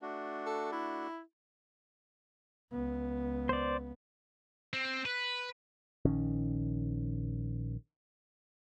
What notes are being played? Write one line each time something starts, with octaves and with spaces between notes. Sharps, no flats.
A3 D4 F#4
A4
E4
C#2 B3
C5 D5
C4
B4
A#1 D#3 C#4